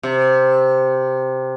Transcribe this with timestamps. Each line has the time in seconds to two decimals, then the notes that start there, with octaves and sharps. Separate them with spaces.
0.03 C3